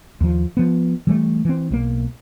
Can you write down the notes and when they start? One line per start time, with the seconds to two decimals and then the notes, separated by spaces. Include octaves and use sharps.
0.21 D#2 F3
0.57 F3 B3
1.07 E3 G3 A3
1.45 E3 C4
1.70 B1 F3 A#3